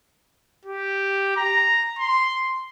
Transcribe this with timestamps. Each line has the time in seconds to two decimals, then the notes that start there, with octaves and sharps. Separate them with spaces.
0.65 G4
1.37 A#5
1.99 C6